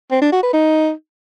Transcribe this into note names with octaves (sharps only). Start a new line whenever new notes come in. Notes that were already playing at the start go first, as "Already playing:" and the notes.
C4
D4
F#4
B4
D#4